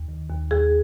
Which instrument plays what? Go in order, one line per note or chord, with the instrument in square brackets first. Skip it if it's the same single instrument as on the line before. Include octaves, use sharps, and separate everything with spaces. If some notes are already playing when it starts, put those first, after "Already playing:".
Already playing: [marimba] D#2
D#3
D#2
D#2 G#4